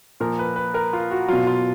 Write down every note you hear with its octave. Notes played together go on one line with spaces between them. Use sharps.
A#2 F3 A#4
B4
B4
A#4
F4
F#4
B2 F#3 F4
F4